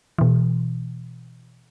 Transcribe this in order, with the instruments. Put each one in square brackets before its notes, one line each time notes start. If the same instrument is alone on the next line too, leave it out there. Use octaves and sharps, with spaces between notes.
[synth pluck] B2 E3